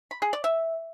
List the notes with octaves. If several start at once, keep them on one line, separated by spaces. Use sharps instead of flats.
B5
G#4
D5
E5